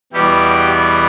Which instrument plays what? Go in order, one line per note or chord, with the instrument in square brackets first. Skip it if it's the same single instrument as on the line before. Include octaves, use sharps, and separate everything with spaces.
[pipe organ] E2 B2 G3 B3 E4 G4